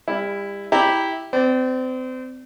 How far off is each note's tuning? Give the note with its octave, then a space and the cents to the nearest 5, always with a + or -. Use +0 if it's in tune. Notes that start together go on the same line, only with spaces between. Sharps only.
G3 +35 E4 +0
E4 -10 G4 +0 A#5 -5
C4 -30 D5 +0